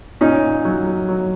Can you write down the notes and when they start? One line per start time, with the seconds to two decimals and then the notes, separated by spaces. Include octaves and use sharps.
0.21 A#2 C#4 D#4
0.43 A#2
0.65 F#3
0.86 F#3
1.08 F#3